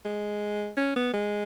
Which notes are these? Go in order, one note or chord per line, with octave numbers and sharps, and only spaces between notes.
G#3
C#4
B3
G#3